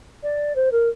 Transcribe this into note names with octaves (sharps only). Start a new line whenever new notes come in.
D5
C5
A#4